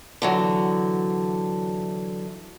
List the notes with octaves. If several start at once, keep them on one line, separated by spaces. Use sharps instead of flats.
D3 E3 F#3